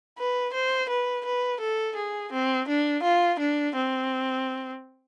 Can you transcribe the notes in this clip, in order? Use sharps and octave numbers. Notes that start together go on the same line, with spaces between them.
B4
C5
B4
B4
A4
G#4
C4
D4
F4
D4
C4